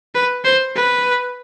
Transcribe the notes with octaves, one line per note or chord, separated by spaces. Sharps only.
B4
C5
B4